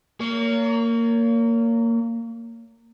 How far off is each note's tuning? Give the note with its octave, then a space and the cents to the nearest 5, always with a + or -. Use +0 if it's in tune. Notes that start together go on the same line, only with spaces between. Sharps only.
A#3 -15 C#5 +35